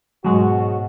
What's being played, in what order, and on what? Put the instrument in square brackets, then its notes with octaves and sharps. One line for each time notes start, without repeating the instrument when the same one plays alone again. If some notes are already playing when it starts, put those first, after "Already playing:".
[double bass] G#2 B2 [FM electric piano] F#3 G#3 [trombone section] F#4